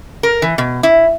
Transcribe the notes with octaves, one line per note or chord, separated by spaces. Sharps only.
A#4
E3
B2
E4